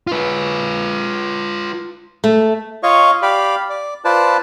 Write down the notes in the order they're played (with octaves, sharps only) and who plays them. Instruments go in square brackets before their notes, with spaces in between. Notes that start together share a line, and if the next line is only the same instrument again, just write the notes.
[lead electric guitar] F4 B4
[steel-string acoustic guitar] A3
[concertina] F4 C#5 D#5 F5 C#6
G4 D5 F5 B5
D5
F4 B4 C5 D5 A5